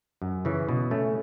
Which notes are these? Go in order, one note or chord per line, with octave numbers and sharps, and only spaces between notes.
F#2
C#3 E3
B2
A3 C#4